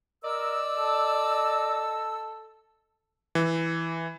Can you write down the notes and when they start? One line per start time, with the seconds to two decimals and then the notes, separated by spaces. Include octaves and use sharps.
0.24 A#4 D5 D#5 E6
0.79 A4
3.35 E3